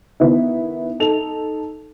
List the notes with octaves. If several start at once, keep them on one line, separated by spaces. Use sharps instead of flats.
D#3 B3 E4
D#4 A4 F7